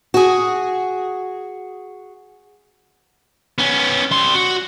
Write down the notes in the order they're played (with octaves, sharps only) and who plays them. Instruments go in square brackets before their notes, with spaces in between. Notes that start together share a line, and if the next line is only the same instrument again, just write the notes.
[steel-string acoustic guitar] F#4 G#4
[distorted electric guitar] B3 C#4
G3 C6
F#4